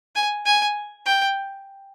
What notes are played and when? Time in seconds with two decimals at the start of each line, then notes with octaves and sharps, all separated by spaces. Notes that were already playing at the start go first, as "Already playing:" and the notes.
0.16 G#5
0.46 G#5
1.06 G5